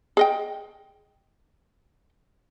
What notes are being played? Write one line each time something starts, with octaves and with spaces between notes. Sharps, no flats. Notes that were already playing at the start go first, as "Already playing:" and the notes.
G#4 D#5 G5